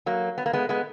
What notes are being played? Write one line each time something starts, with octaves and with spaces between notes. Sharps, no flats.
F#3 A#3
B3
A#3
G#3 B3
G#3 B3